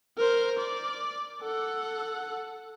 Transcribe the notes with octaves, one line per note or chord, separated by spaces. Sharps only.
A#4 C5
D5
A4 F#5